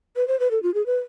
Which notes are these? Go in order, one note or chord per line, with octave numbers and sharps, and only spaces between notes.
B4
C5
B4
A4
F4
G#4
B4